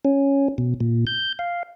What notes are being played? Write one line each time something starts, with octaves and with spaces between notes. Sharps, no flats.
C#4
B2
A#2
G6
F5